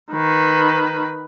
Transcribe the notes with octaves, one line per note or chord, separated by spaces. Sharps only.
D#3 B4